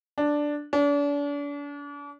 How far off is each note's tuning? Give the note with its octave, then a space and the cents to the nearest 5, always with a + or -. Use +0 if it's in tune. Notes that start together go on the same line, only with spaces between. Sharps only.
D4 +0
D4 -40